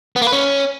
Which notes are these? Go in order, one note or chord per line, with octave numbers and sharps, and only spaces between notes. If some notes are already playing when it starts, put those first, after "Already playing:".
B3
A#3
B4
C#4